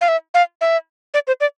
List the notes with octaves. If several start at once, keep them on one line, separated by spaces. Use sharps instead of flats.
F5
E5
F5
E5
D5
C5
D5